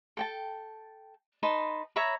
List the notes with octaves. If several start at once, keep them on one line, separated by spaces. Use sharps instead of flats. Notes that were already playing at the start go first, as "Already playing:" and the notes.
A4 G5 A5
D#4 B4 A5 C6
C#5 E5 A#5 B5